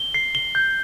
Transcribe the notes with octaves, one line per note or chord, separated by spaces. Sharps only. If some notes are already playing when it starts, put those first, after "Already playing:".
Already playing: G7
C7
G7
G6